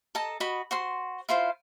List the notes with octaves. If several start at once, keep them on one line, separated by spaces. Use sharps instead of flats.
A4 D#5 A5 A#5
F#4 D#5 B5
F#4 C5 C6
E4 F4 C5 F5